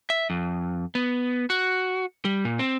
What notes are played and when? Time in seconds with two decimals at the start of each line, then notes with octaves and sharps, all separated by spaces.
0.10 E5
0.30 F2
0.95 B3
1.50 F#4
2.25 G3
2.45 A#2
2.59 C4